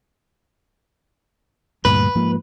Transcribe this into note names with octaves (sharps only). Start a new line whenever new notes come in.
D2 G2 A#2 B4
G#2 F3 A#3